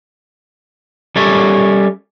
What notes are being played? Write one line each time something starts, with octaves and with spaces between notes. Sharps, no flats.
G3 C#4 A4 A#4 C#5 E5